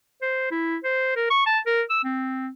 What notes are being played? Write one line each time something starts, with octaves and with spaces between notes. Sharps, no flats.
C5
E4
C5
A#4
C#6
A5
A#4
E6
C4